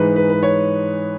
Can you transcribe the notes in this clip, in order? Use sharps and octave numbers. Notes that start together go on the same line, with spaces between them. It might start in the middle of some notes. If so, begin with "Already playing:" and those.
Already playing: G#2 E3 G#3 D#4 B4
B4
B4
C#5